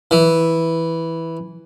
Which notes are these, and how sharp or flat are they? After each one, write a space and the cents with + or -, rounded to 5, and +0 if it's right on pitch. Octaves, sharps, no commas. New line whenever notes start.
E3 -5